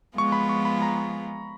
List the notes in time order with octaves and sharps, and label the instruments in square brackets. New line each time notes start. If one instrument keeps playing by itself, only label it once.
[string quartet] F3 G#3 B3 F4 G#4 [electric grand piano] C#6
[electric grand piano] B5
C#6
B5
A#5